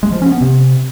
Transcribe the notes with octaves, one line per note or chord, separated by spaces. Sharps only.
G#3
F3
C#4
B3
C3